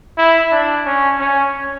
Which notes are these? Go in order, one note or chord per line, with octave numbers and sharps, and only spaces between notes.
E4
D4
C#4
C#4